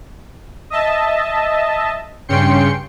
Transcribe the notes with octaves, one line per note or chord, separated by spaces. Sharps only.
D#5 E5 A5
G2 C#3 C#4 G5 C6 C#7